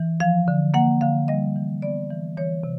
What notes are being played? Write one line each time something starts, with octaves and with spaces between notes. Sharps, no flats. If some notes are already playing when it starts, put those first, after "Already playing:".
Already playing: E3
F3 F5
D3
A#3 F#5
D3 F5
G3 D#5
E3
B3 D5
E3
E3 C#5
C3